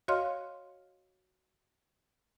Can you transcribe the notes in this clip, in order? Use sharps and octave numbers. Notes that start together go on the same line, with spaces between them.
F#4 C#5 D#5 F5 C6 F6